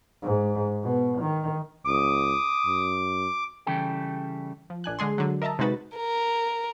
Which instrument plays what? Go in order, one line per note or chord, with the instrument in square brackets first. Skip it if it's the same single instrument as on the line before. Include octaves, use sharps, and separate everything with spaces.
[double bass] G#2
B2
D#3
[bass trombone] C#2 [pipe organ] D6 [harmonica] D#6
[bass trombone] F#2
[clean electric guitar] C#3 E3 G3 A4 G5
[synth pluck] F3
A#1 D4 G#5 F#6
D3 G#3 G#4 C6
D3 F#3
A#4 D#5 E5 A5 A#5
C3 G#3 D#4 F#4 B4 A6
[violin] A#4